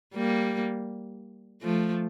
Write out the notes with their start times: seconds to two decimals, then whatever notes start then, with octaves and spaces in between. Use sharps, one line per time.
0.15 G3 A#3
1.62 F3 A3